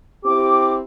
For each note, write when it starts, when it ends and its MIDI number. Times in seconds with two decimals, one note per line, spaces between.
0.24 0.81 60
0.24 0.81 64
0.24 0.81 67
0.24 0.73 86